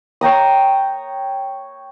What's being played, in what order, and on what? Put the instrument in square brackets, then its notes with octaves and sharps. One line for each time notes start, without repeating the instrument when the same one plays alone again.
[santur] C#5 G5 A#5 D#6